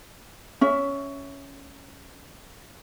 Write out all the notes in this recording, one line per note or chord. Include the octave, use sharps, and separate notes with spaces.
C#4 E5